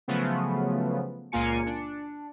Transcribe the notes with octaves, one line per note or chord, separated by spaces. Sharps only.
C#3 F3 F#3 A3 B3
C#2 A#2 A#3 F4 G#5 C#7
D4